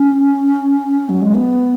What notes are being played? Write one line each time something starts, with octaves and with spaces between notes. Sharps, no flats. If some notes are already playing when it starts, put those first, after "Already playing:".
Already playing: C#4
F#3
G#3
B3